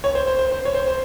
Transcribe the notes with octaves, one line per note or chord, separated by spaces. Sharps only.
C#5
C5
C5
C5
C5
C#5
C5
C5